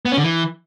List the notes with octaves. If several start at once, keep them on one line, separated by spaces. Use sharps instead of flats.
B3
C#4
D3
E3